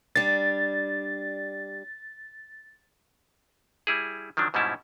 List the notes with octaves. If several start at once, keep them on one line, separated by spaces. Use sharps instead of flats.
G3 D4 A6
G3 E4 G#4
D#3 F3 F#3 D4
G#2 B2 G3 C#4 E4 A5